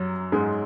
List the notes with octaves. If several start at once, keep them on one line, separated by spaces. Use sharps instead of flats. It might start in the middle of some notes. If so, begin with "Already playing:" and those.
Already playing: F#2 F#3
G#2 G#3